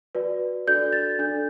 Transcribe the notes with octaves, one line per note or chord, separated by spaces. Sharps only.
F#4 B4 D5
D4 F#4 A4 D5 G6
A6
D4 A4 D5 G6